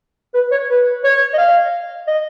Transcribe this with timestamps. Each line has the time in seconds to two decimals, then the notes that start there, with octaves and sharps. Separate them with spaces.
0.34 B4
0.51 C#5
0.70 B4
1.04 C#5
1.34 D#5
1.38 F5
2.07 D#5